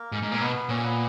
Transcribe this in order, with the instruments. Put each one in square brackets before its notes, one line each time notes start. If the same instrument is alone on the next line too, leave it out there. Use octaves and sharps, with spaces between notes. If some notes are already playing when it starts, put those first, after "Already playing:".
Already playing: [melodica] A#3 A#4
[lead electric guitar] G#2
G#2
A#2
[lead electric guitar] B2 [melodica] B3 B4
[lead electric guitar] A#2 [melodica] C#4 C#5
[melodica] B3 B4